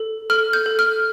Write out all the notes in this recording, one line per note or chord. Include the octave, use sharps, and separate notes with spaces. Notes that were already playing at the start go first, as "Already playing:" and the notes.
Already playing: A4
A4 F6
G6
A4
F6